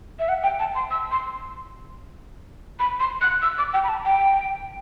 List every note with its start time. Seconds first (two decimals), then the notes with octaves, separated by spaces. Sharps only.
0.19 E5
0.29 F#5
0.43 G5
0.59 A5
0.75 C6
0.91 E6
1.11 C6
2.79 B5
3.00 C6
3.21 F#6
3.42 E6
3.58 D6
3.73 G5
3.84 B5
3.89 A5
4.05 G5